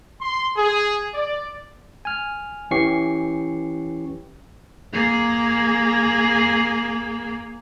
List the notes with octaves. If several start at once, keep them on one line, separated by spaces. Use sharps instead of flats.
C6
G#4
D5
G#5 F6
E3 C#4 G4 C#6 C7
A#3 G#4